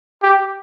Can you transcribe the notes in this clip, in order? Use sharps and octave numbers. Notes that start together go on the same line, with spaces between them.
G4